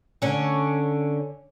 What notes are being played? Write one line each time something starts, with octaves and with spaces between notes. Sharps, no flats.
D3 C#4